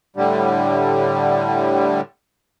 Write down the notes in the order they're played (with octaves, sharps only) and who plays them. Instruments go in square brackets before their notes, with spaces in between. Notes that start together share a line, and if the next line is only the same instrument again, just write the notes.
[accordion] A2 D3 G3